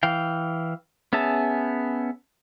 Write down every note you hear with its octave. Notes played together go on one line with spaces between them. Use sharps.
E3 F5 G5
B3 C#4 G#4 E5 A5